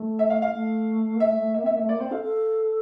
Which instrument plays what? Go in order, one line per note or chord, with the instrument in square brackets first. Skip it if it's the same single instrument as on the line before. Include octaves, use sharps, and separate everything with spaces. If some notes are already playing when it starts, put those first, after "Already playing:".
Already playing: [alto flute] A3
[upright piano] E5
F5
F5
[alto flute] A3
A#3
[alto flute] A3 [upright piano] E5
[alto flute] A3
[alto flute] A#3 [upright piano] E5
[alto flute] C4
[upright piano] E5
[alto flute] A#3
[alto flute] A3 [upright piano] E5
[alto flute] A#3 [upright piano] D5
[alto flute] C4 [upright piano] C5
[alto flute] A4 [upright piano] F5
[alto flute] A4